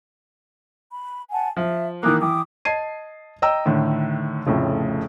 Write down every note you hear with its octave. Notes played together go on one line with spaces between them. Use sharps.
B5
F#5 G#5 A5
F3 E5
D#3 E3 A#3 D6 D#6 F#6
E3 G5 D6 D#6
D#5 A5 G#6 C7 D#7
D#5 G5 A#5 E6
A2 D3 D#3
F1 F2 A2 C#3